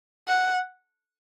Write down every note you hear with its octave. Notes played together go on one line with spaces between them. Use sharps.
F#5